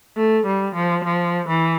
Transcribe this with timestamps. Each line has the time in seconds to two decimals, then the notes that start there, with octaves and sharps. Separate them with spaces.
0.17 A3
0.46 G3
0.75 F3
1.04 F3
1.48 E3